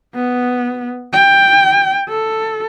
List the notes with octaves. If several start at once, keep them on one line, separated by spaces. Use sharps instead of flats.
B3
G5
A4